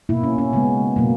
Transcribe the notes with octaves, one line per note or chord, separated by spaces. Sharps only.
B2 A#3 E4
C#4
C#4
C#3 G#3 B3
B2 F#3 A#3